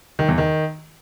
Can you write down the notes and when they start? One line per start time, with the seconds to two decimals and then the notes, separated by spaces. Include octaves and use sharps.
0.19 D#3
0.28 E2
0.38 D#3